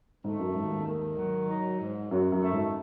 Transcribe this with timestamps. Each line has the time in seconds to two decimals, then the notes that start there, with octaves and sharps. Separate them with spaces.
0.24 G#2 A3
0.39 F#2
0.55 D#2 G#2
0.71 G#2
0.86 D#3
1.17 F#3
1.49 D#4
1.80 G#2
2.11 F#2 F#3
2.32 F#2
2.42 A3
2.52 G#2